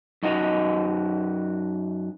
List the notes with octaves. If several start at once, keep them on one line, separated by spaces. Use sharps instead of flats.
F#2 D#4 F#4 D#5